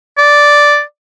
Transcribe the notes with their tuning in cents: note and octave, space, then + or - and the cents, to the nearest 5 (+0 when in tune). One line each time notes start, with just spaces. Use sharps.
D5 -5